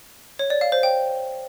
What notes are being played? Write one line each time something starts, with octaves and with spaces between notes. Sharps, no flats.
C#5
D5
F5
C5
G5